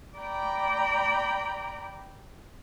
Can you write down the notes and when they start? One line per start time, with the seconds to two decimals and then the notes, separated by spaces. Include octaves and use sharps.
0.17 D5 G5 A#5 B5